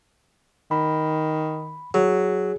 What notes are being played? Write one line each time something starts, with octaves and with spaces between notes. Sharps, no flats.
D#3 B5
F#3 G#4